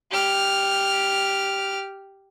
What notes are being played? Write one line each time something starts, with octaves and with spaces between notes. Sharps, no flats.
G4 F6